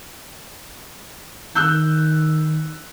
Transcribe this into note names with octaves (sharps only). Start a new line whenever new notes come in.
D#3 E6 F#6 G6